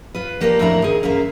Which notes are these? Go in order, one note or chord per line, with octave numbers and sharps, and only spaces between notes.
F4 B4
F3 A#3 G4 A#4 C#5 D5
F2 A2 D4 E4 A#4 A#5
D#3 G#4
F#2 A#3 E5 F5 A#5